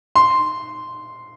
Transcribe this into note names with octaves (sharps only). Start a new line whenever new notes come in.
C6